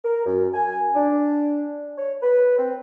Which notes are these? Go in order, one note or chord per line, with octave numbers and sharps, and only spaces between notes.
A#4
F#2
G#5
D4
C#5
B4
C4